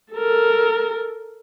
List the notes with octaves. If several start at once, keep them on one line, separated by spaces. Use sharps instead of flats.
A4 A#4